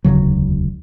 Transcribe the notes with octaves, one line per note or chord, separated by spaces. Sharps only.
E1 D2 C#3 F#3